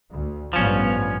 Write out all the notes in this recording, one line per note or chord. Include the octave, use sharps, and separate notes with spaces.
D2
A1 G2 F3 B3 C#4